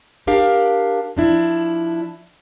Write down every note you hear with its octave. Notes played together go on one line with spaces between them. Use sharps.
D4 G4 A#4 F5
F3 D4 E4